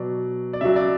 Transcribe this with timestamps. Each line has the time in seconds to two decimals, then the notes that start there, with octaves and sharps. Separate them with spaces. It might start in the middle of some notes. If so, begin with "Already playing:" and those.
Already playing: B2 F#3 D5
0.53 D5
0.61 C#3 F#3 E5
0.76 D5